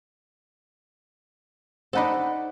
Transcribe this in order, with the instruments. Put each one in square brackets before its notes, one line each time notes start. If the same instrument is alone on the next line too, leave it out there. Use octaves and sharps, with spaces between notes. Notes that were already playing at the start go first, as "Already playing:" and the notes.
[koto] D4 D#4 A4 [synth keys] C5 F#5 B5